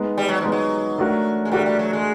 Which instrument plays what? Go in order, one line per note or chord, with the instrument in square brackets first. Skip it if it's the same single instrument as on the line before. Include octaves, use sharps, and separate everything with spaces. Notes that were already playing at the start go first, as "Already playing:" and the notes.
Already playing: [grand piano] G#3 B3 D#4
[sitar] G3
F#3
[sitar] F3 [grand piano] G#3 B3 D#4
[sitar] F#3
[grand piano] A3 D4 F#4 A#4
[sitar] G#3
[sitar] G3 [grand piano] A3 D4 F#4 A#4
[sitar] G3
F#3
G#3